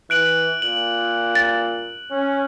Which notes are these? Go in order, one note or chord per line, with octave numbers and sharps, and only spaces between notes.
E3 F#6 D7 F#7
A#2 F#7
A6
C#4